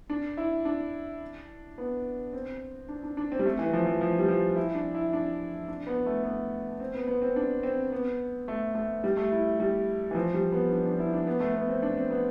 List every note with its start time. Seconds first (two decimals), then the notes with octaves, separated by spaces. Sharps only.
0.10 D4
0.37 E4
0.65 D4
1.78 B3
2.33 C4
2.89 D4
3.03 D4
3.17 D4
3.32 C4
3.39 G3
3.46 A3
3.59 E3
3.73 F3
3.86 F3
4.01 F3
4.19 G3
4.28 F3
4.56 E4
4.75 D4
4.94 E4
5.13 D4
5.68 D4
5.87 B3
6.06 A3
6.24 B3
6.80 C4
6.94 B3
7.08 B3
7.22 C4
7.36 D4
7.63 C4
7.92 B3
8.48 A3
8.75 A3
9.04 G3
9.17 A3
9.32 E4
9.60 G3
10.11 E3
10.15 F3
10.34 G3
10.52 B3
10.71 D4
10.85 D4
11.00 E4
11.13 D4
11.27 B3
11.40 A3
11.54 B3
11.69 C4
11.83 D4
11.97 C4
12.10 B3